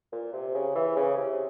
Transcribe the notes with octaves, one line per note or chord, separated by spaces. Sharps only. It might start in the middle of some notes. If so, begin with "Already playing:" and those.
A#2
C3
C#3
E3
C#3
C3